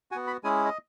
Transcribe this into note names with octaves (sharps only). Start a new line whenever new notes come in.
B3 F#4 G#5
B5
G#3 C#4 E4 G#4 G#5
D#5